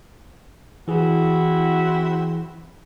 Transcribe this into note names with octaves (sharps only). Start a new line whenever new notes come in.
E3 C4 E4 F#4 G#4